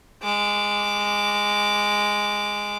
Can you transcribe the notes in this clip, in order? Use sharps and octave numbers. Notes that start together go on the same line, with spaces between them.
G#3 D6